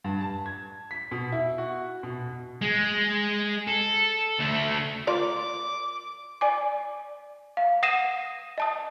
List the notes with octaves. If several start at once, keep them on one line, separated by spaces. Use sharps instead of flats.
G2
A5
G#6
B6
B2
E4
F#4
B2
G#3
A4
D2 A3
F4 A#4 D5 D6
D5 G#5 D6
F5
F#5 D#6 A#6 C7 D#7 E7
D#5 A5 D#6